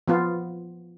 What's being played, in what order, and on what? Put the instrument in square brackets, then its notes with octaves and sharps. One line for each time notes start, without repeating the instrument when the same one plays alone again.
[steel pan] F3 B3 F4